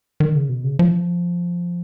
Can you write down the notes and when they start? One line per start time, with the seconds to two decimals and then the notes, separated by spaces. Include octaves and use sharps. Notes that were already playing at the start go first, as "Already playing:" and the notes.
0.20 D#3
0.35 C#3
0.49 B2
0.64 C#3
0.79 F3